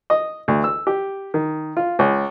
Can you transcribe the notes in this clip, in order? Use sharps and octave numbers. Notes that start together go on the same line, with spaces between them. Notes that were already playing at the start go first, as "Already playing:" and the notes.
D#5
D2
E6
G4
D#3
F4
C#2